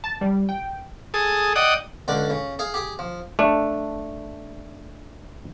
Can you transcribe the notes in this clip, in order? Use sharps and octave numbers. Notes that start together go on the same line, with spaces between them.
A5
G3
G5
G#4 A4 D#6
D5 D#5 F#5 G5 D#6
C#2 D3 D4 D6
C#3
G#4 F5
G4 G#4
F3
A3 D4